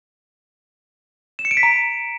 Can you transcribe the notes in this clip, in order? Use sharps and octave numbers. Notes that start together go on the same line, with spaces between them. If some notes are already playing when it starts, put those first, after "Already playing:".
E7
C#7
D7
B6
A#5